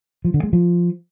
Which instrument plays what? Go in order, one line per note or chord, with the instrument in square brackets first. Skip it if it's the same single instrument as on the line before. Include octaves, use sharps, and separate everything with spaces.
[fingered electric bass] F3
D3
G#3
F3